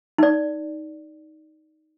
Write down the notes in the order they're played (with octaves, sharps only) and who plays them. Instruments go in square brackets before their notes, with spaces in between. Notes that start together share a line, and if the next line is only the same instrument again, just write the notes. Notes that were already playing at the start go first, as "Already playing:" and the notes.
[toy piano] D#4 D5